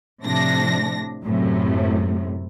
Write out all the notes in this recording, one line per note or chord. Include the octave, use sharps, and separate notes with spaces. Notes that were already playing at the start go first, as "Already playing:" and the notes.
A2 C3 F3 D4 A#6
F#2 A2 C3